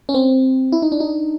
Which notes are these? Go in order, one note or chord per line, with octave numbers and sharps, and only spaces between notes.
C#4
C4
E4
D#4
D4
D#4